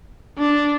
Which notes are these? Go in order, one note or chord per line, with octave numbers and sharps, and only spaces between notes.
D4